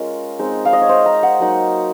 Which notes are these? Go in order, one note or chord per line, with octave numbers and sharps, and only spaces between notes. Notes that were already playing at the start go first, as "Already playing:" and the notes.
Already playing: G#3 C#4 F4 A#4
G#3 C4 D#4
F5
D#5
C#5
C5
A#5
F#5
F#3 A#3 D#4